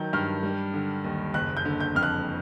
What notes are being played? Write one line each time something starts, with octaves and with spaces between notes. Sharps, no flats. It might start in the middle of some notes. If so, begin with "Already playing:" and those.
Already playing: D#3 F#3 G6
G2 F6
G3
D3
D#2
F#1 F#6
G6
D3
G6
F2 F6
F#6